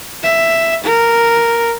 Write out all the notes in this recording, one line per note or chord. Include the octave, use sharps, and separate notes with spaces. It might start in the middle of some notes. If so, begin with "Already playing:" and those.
E5
A#4